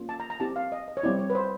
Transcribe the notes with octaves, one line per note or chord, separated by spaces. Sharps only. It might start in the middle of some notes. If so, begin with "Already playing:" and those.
Already playing: A#3 C#4 F4
A5
A#5
A#5
C4 E4 G4 A5
F5
D#5
D#5
C#5
G3 C4 E4 D5
C#5
B4
C5